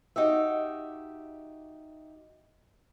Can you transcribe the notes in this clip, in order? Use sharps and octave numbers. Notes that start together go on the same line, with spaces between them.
D#4 F#4 G4 E5